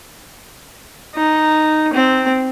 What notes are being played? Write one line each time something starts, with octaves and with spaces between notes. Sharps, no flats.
D#4
C4